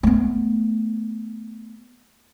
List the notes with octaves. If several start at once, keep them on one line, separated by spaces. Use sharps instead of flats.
A3 B3